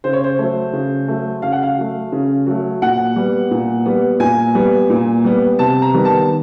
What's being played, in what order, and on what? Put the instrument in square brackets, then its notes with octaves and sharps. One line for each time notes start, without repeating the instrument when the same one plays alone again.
[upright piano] C#3 C5
C#5
C5
F#3 A3
C#3
F#3 A3
C#3 F5
F#5
F5
F#3 A3
C#3
F#3 A3
A#2 F#5
G3 B3
A#2
G3 B3
A#2 G#5
G3 B3
A#2
G3 B3
C3 A5
A#5
D#3 G3 B3
A5